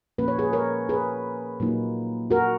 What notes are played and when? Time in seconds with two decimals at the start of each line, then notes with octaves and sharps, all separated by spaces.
0.18 A#2 F3 A#3 C#4 B4
0.28 C#5
0.39 G#4 B4
0.53 A#4 C#5
0.89 G#4 B4
1.60 A#2 F#3 A#3 D#4
2.30 F#4 A#4